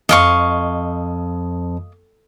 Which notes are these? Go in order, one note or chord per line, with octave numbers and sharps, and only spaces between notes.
F2 D#5 F5 C#6